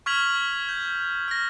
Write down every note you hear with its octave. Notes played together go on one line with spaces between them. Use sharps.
C#6 F6 G#6 B6 F7 F#7
G6
F6 A#6